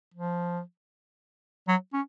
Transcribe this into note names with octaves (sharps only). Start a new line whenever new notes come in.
F3
F#3
C#4